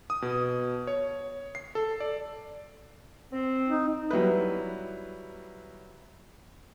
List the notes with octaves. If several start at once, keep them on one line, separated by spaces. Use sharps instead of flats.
D#6
B2
C#5
C7
A4
D5
C4
D#4
F#3 G3 E4 B4